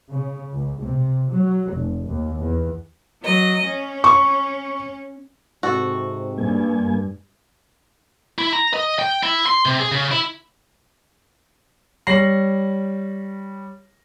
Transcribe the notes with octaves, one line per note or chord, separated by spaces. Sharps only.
C#3
C#2
C3
F#3
F1
D#2
E2
F#3 D#5
C#4
C#6
G#2 C3 F#4 A4
G2 A#3 G#5
E4
A#5
D#5
G5
E4
C6
C3
G#4
C#3
E4
G3 C#5 A#6 C7 F#7